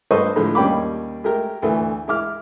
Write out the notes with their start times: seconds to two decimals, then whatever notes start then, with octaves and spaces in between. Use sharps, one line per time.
0.11 G2 A4 B4 C5 D#5 C#6
0.36 A2 D3 F3 G#3
0.55 D#2 G3 C#4 G5 B5 D6
1.24 G#3 A3 G4 A#4
1.62 D2 E3 A3
2.08 G#3 E4 D6 F6